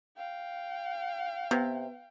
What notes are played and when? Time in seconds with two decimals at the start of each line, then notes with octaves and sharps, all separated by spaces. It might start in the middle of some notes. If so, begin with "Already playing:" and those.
0.17 F5 G5
1.51 C3 B3